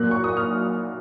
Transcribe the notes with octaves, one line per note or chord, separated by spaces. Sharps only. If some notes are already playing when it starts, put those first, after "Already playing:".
Already playing: A#2 F#3 A#3 F#6
C#6
D#6
F6